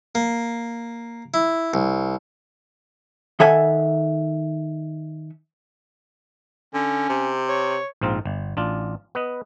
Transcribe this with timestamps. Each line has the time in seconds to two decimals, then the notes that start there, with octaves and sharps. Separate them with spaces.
0.15 A#3
1.34 E4
1.74 C2
3.40 D#3 A4 E5 F#5 G#5
6.74 D3 C#4
7.09 C3
7.49 C#5
8.01 A#1 G#2 C4 F4 A#5
8.25 G1
8.57 A1 D4 F4
9.15 B3 B4 D#5